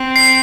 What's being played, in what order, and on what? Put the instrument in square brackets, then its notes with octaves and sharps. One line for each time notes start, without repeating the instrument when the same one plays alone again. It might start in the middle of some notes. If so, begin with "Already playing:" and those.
Already playing: [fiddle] C4
[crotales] C7